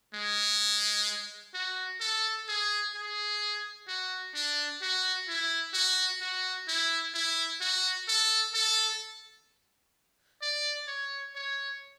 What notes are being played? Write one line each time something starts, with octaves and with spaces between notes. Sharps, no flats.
G#3
F#4
A4
G#4
G#4
F#4
D4
F#4
E4
F#4
F#4
E4
E4
F#4
A4
A4
D5
C#5
C#5